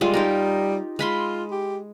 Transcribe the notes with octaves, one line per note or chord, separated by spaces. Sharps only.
G3 G#3 F4
D#4 G4 A#4
G#3 F4 B5 C6
G4